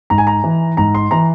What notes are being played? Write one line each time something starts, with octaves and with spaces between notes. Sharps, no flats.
G#2 A#5
G#5
A#5
E3
G#2 A#5
C6
E3 A#5